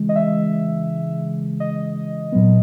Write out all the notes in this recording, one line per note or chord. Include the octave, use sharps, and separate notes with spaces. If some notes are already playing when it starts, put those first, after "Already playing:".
Already playing: C#3 E3 G#3
D#5
E5
D#5
A#2 F#3 B3